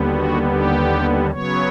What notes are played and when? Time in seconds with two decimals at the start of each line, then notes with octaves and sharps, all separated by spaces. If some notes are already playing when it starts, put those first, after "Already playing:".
Already playing: D#2 D3 G3 B3
0.10 F#4
0.50 G4
1.31 C#3 F#3 B3 C#5